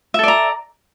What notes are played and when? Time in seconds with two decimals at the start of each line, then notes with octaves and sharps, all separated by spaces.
0.14 E5
0.19 A4
0.23 D5
0.28 A#5